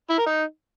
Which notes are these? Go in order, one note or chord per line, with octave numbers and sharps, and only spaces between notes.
E4
A#4
D#4